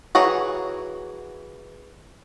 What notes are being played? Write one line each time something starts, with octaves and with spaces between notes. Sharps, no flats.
E3 F#4 G#4 C#5 A#5